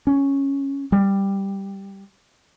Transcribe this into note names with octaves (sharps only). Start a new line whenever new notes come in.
C#4
G3